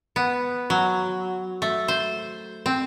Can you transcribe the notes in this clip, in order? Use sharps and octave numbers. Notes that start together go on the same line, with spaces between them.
B3
F#3
A3
C5
C4